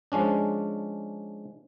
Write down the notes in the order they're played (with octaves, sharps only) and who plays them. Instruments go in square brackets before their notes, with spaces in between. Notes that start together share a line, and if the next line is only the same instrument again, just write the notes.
[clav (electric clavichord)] F3 G#3 C#4 D4